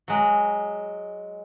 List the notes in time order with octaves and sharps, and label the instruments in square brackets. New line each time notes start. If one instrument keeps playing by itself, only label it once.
[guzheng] F#3 G#3